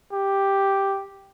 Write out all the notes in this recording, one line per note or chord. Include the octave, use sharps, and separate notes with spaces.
G4